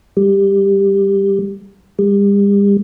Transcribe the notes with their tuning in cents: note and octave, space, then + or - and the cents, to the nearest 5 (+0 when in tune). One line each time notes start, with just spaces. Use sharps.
G3 +10
G3 +40